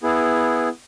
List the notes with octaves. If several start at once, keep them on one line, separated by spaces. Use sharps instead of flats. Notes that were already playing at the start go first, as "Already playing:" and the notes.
B3 E4 G#4